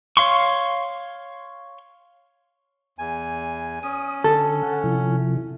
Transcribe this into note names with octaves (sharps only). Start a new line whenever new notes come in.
C#5 F5 C6 C#6
E2 G#5
C#4 D#6
D3 A4
F#5
C3 F3 E4